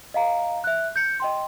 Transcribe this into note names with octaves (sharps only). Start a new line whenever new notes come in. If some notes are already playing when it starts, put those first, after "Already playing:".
D#5 F5 A#5
E5 F#6
G6 C#7
D#5 G5 C6